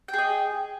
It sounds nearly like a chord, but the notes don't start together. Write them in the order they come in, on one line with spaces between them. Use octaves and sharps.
G5 G#4 D#5